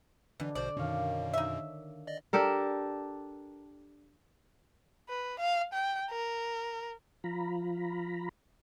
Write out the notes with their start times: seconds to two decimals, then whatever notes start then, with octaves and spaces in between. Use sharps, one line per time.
0.40 B2 D3 E3 D4
0.55 A#1 B2 C5 D5
0.77 F#2 B2 D#3 D4 C#5 F5
1.34 D#4 E5
2.07 D5 D#5
2.33 D4 G4 A4 A#4
5.09 B4
5.39 F5
5.74 G5
6.11 A#4
7.24 F3 F4 A#5 B5